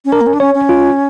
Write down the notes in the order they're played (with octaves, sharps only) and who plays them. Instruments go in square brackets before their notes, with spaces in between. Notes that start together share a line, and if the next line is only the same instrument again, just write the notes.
[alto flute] C#4
[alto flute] D4 [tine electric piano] A#4
[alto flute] A#3
C#4
D4
[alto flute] C#4 [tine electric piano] C#5
[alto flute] C#4
[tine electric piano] F4